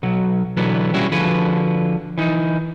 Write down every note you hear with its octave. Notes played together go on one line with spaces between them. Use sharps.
B1 F#3
B2 D3 E3 F#3 B3
G3 C#4 E4 F#4 G#4
D3 F3 F#4 G#4 B4
E3 D#4